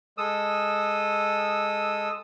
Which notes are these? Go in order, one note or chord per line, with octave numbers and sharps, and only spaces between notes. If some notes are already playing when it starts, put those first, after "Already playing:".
G#3 A4 D#6 E6